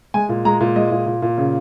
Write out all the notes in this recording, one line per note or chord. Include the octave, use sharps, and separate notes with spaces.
G#3 G#5
A#2
G#3 A#5
A#2
G#3 D#5
A#2
A#2
A#2
C#3